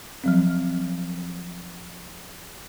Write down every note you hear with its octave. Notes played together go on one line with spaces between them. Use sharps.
F3 F#3 C4